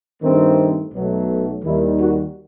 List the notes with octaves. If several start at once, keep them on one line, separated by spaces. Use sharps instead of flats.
G2 D#3 A3 C4
B1 B2 F#3 A3
D#2 D#3 G3 E4
F#4